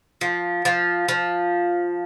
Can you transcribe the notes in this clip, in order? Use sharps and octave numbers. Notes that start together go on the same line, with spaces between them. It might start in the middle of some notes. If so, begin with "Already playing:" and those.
F3
F3
F3